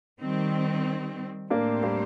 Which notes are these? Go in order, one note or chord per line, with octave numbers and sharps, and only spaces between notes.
D#3 G3 C4
A2 A3 A#3 C4 D4 G4 C5
G3 A#3